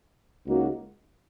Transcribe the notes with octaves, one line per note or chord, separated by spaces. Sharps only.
C#2 C#3 A#3 D#4 F#4